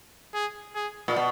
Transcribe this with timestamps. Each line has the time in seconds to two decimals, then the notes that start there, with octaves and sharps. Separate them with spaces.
0.34 G#4
0.75 G#4
1.08 A#2
1.16 B2